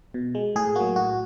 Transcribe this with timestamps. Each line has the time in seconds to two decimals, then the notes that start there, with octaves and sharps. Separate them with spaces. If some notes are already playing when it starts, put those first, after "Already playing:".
0.14 B2
0.35 G#3
0.56 A2 G#4
0.75 F#3 A#3 F#4
0.96 A2 F#4